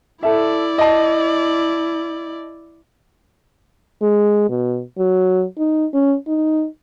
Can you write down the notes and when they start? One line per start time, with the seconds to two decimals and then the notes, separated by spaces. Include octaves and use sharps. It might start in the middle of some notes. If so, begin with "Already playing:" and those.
0.23 E4 A4 D5 E5
0.78 D#5 A5
4.02 G#3
4.49 B2
4.98 F#3
5.58 D#4
5.94 C#4
6.28 D#4